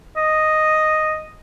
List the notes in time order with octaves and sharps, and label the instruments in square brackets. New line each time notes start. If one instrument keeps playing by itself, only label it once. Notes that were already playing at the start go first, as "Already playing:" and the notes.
[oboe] D#5